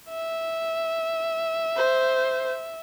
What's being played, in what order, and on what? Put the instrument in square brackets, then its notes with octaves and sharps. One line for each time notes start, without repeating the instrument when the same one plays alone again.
[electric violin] E5
[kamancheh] C5